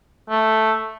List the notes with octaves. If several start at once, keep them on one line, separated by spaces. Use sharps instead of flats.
A3